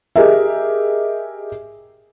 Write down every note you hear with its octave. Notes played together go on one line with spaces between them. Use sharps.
G4 G#4 A#4 D#5 E5